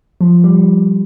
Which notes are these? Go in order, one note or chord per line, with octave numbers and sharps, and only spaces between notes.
F3
G3